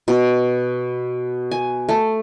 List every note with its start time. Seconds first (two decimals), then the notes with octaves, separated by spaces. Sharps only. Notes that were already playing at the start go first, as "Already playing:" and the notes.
0.08 B2
1.51 G#5
1.89 A3